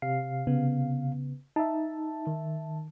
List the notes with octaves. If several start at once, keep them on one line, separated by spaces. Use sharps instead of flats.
C3 F5 C7
C#3 B3
D#4 E5 A5
D#3